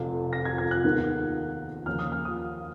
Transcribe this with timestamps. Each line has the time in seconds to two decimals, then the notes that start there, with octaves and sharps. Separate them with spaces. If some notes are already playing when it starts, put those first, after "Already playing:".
Already playing: F1 F2 F3
0.33 A#6
0.45 G#6
0.58 G#6
0.71 F#6
0.84 D#2 D#3 G#3 B3 D#4
1.86 D#2 C#3 F3 A#3 C#4 F6
1.99 D#6
2.12 F6
2.25 D#6